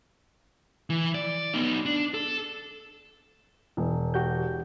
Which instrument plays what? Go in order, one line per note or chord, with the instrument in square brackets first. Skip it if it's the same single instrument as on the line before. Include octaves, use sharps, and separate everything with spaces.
[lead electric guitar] E3
D5
B3 D#4
D4
A4
[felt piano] E1
[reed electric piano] F#4 G4 G6